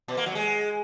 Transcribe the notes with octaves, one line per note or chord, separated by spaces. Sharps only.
B2
A#3
F#3
G#3